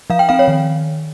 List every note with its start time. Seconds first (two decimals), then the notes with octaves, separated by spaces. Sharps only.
0.10 F3 F5
0.19 G5
0.29 C4 F5
0.39 C#5
0.48 D#3